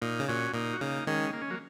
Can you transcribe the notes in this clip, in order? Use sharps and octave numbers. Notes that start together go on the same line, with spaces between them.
A#2 A#3 D#4
C#3
A#2 C#4 F#4
A#2 A#3 D#4
F#4
C#3 A#3 D#4
D#3 G#3 C#4
A#3
C#4
F#3 A#3